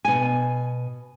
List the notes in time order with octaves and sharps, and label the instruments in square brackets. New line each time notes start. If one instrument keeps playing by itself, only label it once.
[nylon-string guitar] B2 G#5